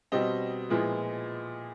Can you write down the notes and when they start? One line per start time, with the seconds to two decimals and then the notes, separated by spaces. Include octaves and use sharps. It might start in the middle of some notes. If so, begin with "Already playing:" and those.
0.12 B2 G3 C4 D#5
0.70 A#2 F3 G#3 B3 E4